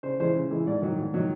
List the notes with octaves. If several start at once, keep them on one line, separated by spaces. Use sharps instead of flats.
C#3 C5
E3 G#3 C5
C#3
E3 G#3
G#2 D5
D#3 F#3
G#2
D#3 F#3